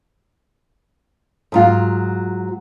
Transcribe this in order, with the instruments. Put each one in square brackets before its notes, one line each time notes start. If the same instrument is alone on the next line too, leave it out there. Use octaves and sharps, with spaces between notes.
[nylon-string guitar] G#2 F#3 F4